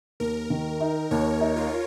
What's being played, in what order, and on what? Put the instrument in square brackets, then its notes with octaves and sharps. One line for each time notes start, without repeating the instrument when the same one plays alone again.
[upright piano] D#2 [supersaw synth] A#4
[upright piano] D#3
D#4
[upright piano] D#2 [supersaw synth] C#5
[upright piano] D#4
[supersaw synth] F4